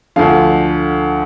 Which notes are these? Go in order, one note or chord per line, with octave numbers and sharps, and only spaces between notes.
D2 D3 F3 F5